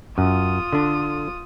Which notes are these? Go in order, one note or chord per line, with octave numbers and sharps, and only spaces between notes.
F#2 F4 D#6
D3 D4